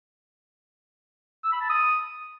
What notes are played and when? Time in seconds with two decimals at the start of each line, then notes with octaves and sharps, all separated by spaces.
1.44 E6
1.52 B5
1.61 A5
1.69 D#6